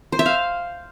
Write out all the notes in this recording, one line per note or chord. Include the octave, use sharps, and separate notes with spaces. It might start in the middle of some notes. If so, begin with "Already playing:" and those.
C5
E5
F5